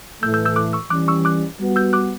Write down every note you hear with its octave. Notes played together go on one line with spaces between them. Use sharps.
A2 E3 A3 E6 G6
E6 G6
E6 G6
D6 F#6
C#6 E6
E3 G3 C#4 D6 F#6
C#6 E6
D6 F#6
G3 B3 F#4
E6 G6
D6 F#6